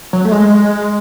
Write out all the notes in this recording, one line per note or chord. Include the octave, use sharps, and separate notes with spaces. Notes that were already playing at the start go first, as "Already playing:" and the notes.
F#3
A3
G#3